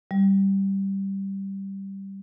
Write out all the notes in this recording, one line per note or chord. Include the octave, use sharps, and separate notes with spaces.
G3